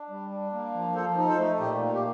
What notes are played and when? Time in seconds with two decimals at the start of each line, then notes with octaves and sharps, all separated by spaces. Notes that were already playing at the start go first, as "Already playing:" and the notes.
Already playing: D4
0.10 G3
0.31 D4
0.53 A#3
0.74 F3
0.95 F3 A4 C5
1.17 D#4
1.28 A4 C5
1.39 A3
1.60 A#2 G4
1.82 A#3
1.93 G4